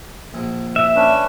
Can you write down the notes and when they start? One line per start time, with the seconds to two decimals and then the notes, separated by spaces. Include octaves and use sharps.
0.34 A#1
0.76 E5
0.96 C#4 D4 B4